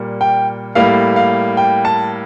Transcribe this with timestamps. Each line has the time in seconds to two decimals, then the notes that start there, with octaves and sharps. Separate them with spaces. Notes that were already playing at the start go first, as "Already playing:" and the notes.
Already playing: A#2 G3 A#3
0.21 G5
0.75 A2 G3 A#3 F5
1.16 F5
1.57 G5
1.85 A5